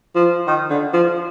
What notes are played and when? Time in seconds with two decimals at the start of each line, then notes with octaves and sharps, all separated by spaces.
0.15 F3
0.47 D#3
0.70 D3
0.93 F3